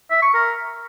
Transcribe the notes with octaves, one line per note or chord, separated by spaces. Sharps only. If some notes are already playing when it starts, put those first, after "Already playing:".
E5
C#6
A#4